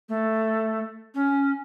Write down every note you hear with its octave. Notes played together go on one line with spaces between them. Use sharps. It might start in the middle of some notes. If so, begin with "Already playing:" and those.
A3
C#4